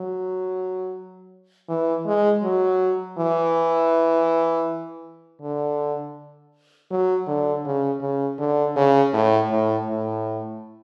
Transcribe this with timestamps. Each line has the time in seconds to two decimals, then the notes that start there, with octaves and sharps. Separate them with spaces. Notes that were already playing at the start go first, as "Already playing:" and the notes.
Already playing: F#3
1.69 E3
2.06 G#3
2.43 F#3
3.18 E3
5.42 D3
6.91 F#3
7.27 D3
7.65 C#3
8.01 C#3
8.39 D3
8.76 C#3
9.13 A2
9.50 A2
9.88 A2